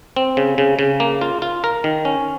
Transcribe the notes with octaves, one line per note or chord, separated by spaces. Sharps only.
C4
C#3
C#3
C#3
A#3
F4
F4
A#4
D#3
C#4